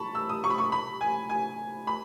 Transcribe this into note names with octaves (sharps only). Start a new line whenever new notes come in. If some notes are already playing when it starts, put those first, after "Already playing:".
Already playing: A5 B5 C#6
E6
D#6
C#6
B5
C#6
B5
G#5
G#5
B5